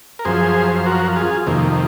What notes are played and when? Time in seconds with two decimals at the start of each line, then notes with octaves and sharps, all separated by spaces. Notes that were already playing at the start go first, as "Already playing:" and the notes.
0.19 A#4
0.25 F#2 F3 G#4 C5
0.76 C5
0.86 F#4 A#4
1.16 F4 G#4
1.47 F2 C3 D#3 A#3